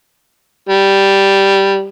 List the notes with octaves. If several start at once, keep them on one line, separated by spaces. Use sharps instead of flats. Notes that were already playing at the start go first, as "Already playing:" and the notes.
G3